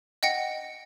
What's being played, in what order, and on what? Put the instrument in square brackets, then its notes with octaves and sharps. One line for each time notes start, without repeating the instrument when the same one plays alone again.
[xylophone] D#5 F#5 G5 A#6 C#7